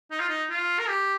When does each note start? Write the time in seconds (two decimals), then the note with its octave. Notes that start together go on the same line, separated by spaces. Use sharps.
0.11 D#4
0.20 F4
0.29 D#4
0.50 F4
0.79 A#4
0.88 G4